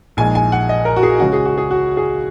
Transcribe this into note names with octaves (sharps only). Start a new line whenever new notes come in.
A#1 A#2 G#3 D#4 G#5
G#5
F#5
D#5
A#4
F#4
G#4
C#2 C#3 G#3 C#4 F#4
G#4
F#4
G#4
F#4
G#4